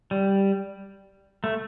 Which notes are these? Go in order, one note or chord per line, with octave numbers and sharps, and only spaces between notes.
G3
A3